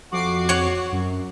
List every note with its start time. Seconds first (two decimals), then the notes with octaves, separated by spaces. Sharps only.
0.12 F2 F#4 D6 C7
0.49 C#5 F#5
0.92 F#2